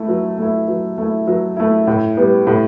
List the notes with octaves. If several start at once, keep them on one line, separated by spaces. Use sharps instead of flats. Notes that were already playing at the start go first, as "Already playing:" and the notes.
Already playing: A3 E4
F#3
A3 E4
F#3
A3 E4
F#3
A3 E4
A2
G3 B3
A2